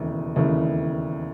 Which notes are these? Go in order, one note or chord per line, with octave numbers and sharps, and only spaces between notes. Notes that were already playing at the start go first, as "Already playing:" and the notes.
Already playing: E1 D#2 C#3 E3 A3
E1 D#2 C#3 E3 A3